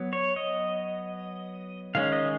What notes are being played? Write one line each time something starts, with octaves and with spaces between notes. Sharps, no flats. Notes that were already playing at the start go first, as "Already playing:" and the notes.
Already playing: F#3 B3
C#5
D#5
D#3 G#3 C#4 F5
D#5